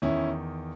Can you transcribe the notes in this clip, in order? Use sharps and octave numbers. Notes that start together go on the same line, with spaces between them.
E2 D#3 C#4 E4